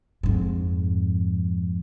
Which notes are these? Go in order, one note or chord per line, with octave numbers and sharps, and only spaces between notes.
F2 G#2